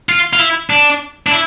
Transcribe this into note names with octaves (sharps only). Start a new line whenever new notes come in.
F4
F4
E4
D4
D4
E4